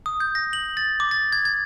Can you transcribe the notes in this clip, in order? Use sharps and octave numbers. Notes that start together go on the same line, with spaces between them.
D#6
G6
A#6
F#7
A6
D6
A6
G#6
G#6